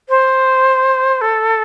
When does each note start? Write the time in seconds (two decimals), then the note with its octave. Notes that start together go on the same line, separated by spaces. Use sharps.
0.09 C5
1.21 A4